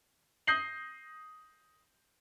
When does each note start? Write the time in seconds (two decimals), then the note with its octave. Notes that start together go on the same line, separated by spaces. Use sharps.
0.47 D#6 G6 A#6 C7 F#7